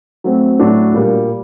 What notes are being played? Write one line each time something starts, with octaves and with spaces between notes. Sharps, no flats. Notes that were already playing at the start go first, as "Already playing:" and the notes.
F#3 A3 C4
A2 F#3 A3 D4 F#4
A#2 G3 A#3